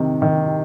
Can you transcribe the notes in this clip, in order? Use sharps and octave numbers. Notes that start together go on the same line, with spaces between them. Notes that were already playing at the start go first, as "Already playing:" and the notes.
Already playing: C3 D#3
D#3